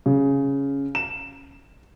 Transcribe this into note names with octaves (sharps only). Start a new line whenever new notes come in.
C#3
E7